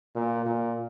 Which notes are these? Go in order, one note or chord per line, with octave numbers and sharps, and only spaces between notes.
A#2
A#2